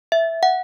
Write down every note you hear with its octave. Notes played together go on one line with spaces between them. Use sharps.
E5
F#5